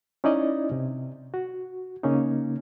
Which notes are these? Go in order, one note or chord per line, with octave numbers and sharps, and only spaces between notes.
C#4 D#4 E4 D5 D#5
C3
F#4
C#3 A#3 C#4 D#4